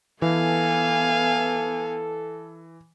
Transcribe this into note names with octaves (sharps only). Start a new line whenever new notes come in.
E3 B3 A4 F5 G#5